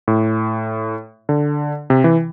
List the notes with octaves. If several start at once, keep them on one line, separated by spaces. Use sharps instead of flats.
A2
D3
C3
E3